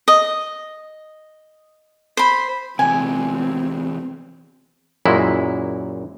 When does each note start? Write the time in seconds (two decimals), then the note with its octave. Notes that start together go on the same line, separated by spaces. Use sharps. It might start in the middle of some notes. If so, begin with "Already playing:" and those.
0.08 D#5
2.17 C5 B5
2.79 E2 C3 C4 G#5
5.05 F#2 A#2 G#3 E4